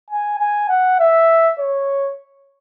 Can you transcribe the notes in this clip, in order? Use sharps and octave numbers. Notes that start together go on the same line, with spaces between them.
G#5
G#5
F#5
E5
C#5